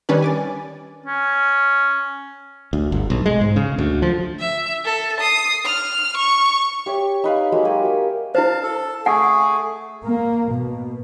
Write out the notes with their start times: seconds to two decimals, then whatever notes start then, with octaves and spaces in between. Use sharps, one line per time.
0.09 D#3 G3 C#4 D4 B4
0.22 G#5 D6 A6
1.06 C#4
2.73 D2
2.92 G1
3.10 B1
3.26 G#3
3.41 G#2
3.56 C#3
3.78 D2
4.02 F3
4.39 E5
4.85 A4
5.20 D#6 C7
5.65 F6
6.17 C#6
6.86 G4 C#5 E5
7.24 D#4 B4 F5
7.52 F#3 G#3 A#3
7.65 G4 A#4 G#5
7.85 E5
8.35 E4 C5 F5 A5
8.63 A4
9.06 A3 G#4 F#5 G#5
10.04 A#3
10.51 B2